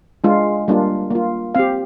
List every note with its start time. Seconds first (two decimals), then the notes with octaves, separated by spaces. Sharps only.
0.24 G#3 D4 F4
0.68 G3 A#3 D4 F4
1.11 A#3 F4
1.55 C4 G4 F5